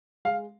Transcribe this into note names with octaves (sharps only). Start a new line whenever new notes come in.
G#3 F5